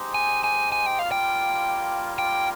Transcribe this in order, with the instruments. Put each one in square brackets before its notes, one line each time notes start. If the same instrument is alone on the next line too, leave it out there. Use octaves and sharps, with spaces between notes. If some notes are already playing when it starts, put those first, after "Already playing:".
Already playing: [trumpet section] G#3 D#4 G4 C5
[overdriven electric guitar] G#5
G#5
G#5
G5
[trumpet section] G3 A#3 F4 [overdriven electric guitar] F5
[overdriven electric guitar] G5
G5